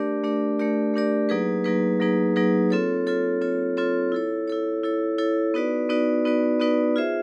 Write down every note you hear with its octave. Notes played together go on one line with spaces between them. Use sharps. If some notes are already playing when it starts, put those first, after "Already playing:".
Already playing: A3 D4 G4 A#4 D5
A3 D4 G4 A#4 D5
A3 D4 G4 A#4 D5
A3 D4 G4 A#4 D5
F#3 A#3 D#4 G#4 B4
F#3 A#3 D#4 G#4 B4
F#3 A#3 D#4 G#4 B4
F#3 A#3 D#4 G#4 B4
C4 F4 A4 C#5
C4 F4 A4 C#5
C4 F4 A4 C#5
C4 F4 A4 C#5
E4 A4 C#5
E4 A4 C#5
E4 A4 C#5
E4 A4 C#5
B3 D#4 F#4 B4 D5
B3 D#4 F#4 B4 D5
B3 D#4 F#4 B4 D5
B3 D#4 F#4 B4 D5
F4 G#4 C5 E5